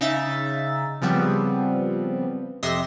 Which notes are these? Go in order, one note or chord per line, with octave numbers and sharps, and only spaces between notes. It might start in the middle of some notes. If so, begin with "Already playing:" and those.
C#3 D#4 E5 A6
C#3 F3 G3 B3 C4
F2 C3 D#5 E5 C6 A#6